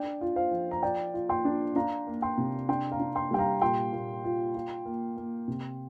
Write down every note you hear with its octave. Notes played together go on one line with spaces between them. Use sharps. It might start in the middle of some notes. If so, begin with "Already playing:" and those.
Already playing: D4 D5 G5
F4
C5 F5
F3
A#5
F4 D5 G5
F4
G5 C6
D4
D4 F5 A#5
A#3
G5 C6
C3
D4 G5 C6
F5 A#5
D4
G5 C6
G3 G5
F5 A#5
A#2 G5 C6
A#2
F4
F4
A#3
A#3
C3